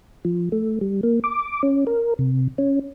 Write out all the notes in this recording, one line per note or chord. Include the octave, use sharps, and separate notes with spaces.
F3
A3
G3
A#3
D6
C#4
A#4
C3
C#4